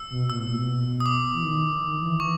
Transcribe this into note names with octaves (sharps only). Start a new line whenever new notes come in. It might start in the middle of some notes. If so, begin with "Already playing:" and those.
Already playing: E6
B2
A#2 E6
A2
A#2
B2
D#6
D6
E3
D#3
D#3
E3
E3 C#6